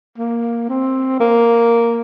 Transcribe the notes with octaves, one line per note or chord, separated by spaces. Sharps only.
A#3
C4
A#3